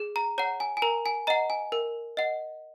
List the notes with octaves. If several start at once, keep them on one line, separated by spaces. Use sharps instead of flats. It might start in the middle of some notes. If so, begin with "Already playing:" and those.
Already playing: G#4
A#5
C#5 F#5 A#5
G#5
G#5
A#4 A#5
G#5
D#5 F#5 A#5
G#5
A#4
D#5 F#5